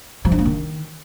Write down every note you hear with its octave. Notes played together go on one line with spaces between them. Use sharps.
F3
D4
A#3
D#3